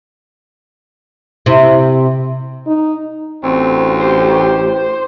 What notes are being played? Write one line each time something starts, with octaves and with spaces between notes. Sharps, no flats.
C3 E4
D#4
A1 D2 C4
G4 C5